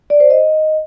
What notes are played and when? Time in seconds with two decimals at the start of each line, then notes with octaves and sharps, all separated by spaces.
0.10 D5
0.20 C5
0.30 D#5